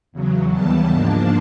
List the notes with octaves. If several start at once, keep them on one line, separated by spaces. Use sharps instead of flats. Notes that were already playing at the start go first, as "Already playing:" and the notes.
E2 C#3 F#3
D#2 C#3 E3 G3 B3 A5
G#2 F3 A#3 D4